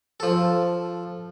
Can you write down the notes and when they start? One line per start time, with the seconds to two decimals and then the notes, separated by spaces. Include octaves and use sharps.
0.20 F3 A4